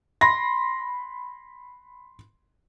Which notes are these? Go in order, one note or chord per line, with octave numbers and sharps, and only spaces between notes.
B5 C6 A#6